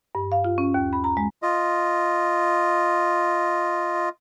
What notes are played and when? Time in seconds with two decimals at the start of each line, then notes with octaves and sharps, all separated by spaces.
0.15 G2
0.32 F5
0.45 F4
0.58 C#4
0.74 D#2
0.93 B5
1.04 A#5
1.17 G#3
1.42 F4 D#5